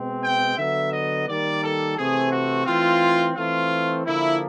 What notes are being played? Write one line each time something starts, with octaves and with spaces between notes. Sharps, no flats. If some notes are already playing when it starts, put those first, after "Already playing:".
Already playing: B2 G#3 C4
G5
D3 F#3 B3 E5
D#5
D#3 G3 A#3 D5
A4
C3 E3 A3 C4 G#4
F#4
E3 A3 C4 F4
E3 A3 C4 F4
D3 F3 A#3 E4